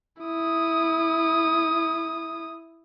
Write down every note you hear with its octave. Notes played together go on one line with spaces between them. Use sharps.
E4 D#6